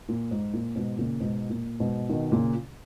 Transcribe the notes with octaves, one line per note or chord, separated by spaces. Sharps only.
A#2
G#2
A#2
G#2 B2
A#2 C#3
G#2 B2
A#2
G#2 B2
B2 D#3
A#2 C#3